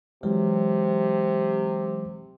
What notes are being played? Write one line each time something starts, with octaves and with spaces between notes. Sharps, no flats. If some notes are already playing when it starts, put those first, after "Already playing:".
C3 E3 F#3 G#3